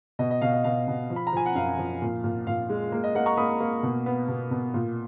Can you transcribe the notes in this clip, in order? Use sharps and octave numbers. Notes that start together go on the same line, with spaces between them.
B2 D#5
D#5
B2 F5
D#5
B2 F5
B2
F3
B5
A#5
F3 G#5
F#5
F#2 F5
F3
A#2
A#2
A#2 F5
G#3
A#3
D#5
A#3 D#5 F#5
A#5 C#6
A#3 B5 D#6
A#3
B2
B3
B2
B2
A#2